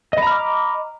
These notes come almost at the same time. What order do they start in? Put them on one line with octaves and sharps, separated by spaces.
D#5 B5 A#5 F6 D6